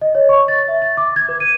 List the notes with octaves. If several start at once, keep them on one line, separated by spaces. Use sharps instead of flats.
D#5
C#5
C#6
A6
E5
A6
D6
G#6
B4
D#7